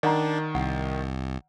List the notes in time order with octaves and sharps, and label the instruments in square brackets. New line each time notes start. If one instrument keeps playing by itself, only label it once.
[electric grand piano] D#3 [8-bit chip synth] D4 [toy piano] D5 F#5 A#5
[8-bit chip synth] C2 [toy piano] F#5